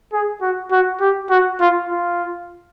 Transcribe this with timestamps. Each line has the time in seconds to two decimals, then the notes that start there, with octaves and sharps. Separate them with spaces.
0.13 G#4
0.42 F#4
0.72 F#4
1.01 G4
1.30 F#4
1.61 F4
1.89 F4